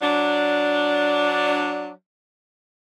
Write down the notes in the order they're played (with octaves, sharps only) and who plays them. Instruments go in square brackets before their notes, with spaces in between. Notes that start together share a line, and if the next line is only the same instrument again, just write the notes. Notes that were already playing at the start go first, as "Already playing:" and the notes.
[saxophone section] F#3 D4